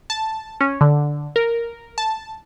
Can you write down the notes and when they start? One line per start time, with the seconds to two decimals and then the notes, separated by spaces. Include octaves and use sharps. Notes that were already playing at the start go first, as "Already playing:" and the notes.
0.10 A5
0.61 C#4
0.81 D3
1.36 A#4
1.98 A5